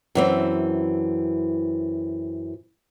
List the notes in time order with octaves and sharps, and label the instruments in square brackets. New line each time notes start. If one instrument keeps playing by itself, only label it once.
[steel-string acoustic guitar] F#2 E3 C4